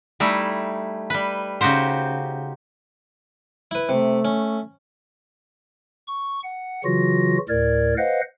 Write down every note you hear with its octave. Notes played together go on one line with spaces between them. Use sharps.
G3 A3 D#4 E4
G3 B4
C#3 D#4 F#4 G4 C5
E4 B4
C3 A3
C#4
C#6
F#5
C#3 E3 F#3 F4 F#4 A#6
D2 A2 A#4 D5 G#6
B4 C5 D#5 F5 F#5